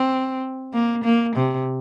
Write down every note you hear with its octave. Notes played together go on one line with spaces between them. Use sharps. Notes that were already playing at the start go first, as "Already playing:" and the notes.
Already playing: C4
A#3
A#3
C3